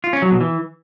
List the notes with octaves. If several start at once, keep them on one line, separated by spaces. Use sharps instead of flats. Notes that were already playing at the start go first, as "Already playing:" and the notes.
F4
C#4
F#3
B2
E3